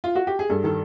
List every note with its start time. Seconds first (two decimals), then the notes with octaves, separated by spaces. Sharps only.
0.04 F4
0.15 F#4
0.27 G4
0.39 G#4
0.50 G2 A4
0.64 D#3 A4